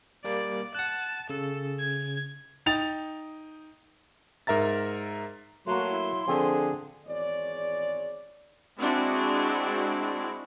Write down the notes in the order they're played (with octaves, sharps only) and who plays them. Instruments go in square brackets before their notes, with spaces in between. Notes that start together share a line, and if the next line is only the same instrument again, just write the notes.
[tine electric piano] G3 A#3 [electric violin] D5
[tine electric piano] F#5 F#6 [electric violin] A5
[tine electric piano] C#3 [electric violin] A4
[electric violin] G#6
[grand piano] D#4 G5 A6 F7
[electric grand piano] G#2 A#4 E5 A#5 A6
[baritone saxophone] F#3 [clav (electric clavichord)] A3 A#3 [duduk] F#4 [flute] C6
[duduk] E4
[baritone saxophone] D3 [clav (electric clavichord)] F3 C4 [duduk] G#4
[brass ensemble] G#1 E2 G#3 C#5 D5
[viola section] G#3 C4 D4 E4 F#4